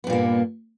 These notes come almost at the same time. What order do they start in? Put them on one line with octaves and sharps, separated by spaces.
B3 G2 A#2 A#3